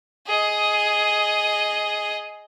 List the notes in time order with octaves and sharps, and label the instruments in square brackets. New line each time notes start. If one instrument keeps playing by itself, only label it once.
[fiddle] G#4 D#5